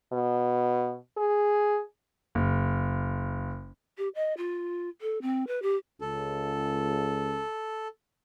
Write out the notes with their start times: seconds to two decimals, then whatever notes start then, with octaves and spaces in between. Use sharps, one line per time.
0.12 B2
1.17 G#4
2.35 F#1
3.98 G4
4.15 D#5
4.37 F4
5.01 A4
5.22 C4
5.47 B4
5.62 G4
6.01 C#2 A4